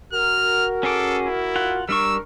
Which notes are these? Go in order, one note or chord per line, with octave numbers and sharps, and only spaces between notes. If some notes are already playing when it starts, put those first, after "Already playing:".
F#4 A#4 F6
C#4 G#4 A4 D6
E4
F4 F#5
G3 D4 A#4 C#6 E6